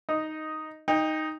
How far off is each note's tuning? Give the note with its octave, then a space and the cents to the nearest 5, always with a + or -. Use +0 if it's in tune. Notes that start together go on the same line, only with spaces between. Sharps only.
D#4 +0 D#5 +0
D#4 +0 G5 +25